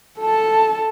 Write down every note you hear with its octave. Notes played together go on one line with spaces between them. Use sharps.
A4 A5